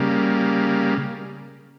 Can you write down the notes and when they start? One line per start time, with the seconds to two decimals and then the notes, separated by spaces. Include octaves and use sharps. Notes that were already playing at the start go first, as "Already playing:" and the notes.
Already playing: C#3 G3 A#3